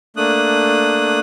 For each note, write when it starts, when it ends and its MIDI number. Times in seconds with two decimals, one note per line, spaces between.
0.17 1.20 57
0.17 1.20 58
0.17 1.20 62
0.17 1.20 87
0.17 1.20 90